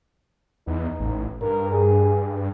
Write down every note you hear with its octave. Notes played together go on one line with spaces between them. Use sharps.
E2 D#4
A1
G2 A#4
G#4